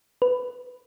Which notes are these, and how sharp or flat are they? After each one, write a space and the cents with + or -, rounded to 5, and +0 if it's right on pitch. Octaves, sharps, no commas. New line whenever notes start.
B4 +10